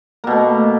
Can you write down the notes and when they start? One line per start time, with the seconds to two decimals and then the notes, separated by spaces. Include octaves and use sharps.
0.24 A#3
0.27 B2
0.31 A3